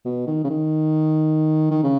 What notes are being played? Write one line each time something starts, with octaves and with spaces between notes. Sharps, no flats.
B2
D#3
C#3
D#3
D#3
C#3